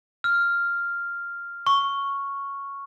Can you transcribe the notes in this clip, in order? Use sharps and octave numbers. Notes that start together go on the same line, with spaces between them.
F6
C#6